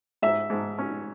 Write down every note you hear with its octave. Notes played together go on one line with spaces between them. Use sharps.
G#2 E5
G#2
C#4